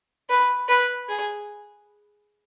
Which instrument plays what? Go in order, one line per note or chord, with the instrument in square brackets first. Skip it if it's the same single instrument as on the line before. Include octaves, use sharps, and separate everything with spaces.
[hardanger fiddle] B4
B4
G#4